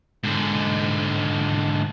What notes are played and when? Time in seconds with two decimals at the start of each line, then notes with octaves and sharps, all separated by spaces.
0.24 G#2 D3